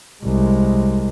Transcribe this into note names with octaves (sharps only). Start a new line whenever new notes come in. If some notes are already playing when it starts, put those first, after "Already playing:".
C2 G#3